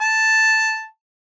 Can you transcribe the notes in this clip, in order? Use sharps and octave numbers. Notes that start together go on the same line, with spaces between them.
A5